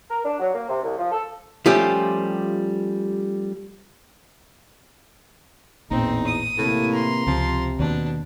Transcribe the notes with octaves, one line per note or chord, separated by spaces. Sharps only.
A#4
D4
F#3
A#3
C3
C2
F3
A4
F3 G3 A3 C#4 F4 G4
A1 E2 A#2 C4 D#4
D#6
A2 C3 E3 A#3
A#5 C6
C#2 C3 F3
D#2 B2 D4